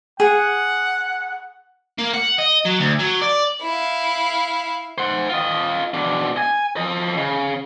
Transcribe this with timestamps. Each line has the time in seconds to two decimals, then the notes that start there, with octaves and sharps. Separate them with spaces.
0.20 G#4 F#5
1.98 A#3
2.14 F#5
2.38 D#5
2.65 F#3
2.80 D2
2.99 F#3
3.22 D5
3.62 E4 F5
4.98 C5 F#5
5.29 F4 D#5
5.94 B2 D4
6.37 G#5
6.77 F3 D#5
7.17 C#3